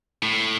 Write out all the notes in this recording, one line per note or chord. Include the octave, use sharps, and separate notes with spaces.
A2